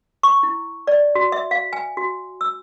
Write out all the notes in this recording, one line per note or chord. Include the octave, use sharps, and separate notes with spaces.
C#6
E4
D5
F#4
E5
F5
G#5
F#4
E6